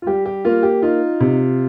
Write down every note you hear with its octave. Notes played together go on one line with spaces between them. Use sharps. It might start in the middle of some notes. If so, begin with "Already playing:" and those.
F4
G3 G4
G4
A#3 F4
G4
D#4 F4
C3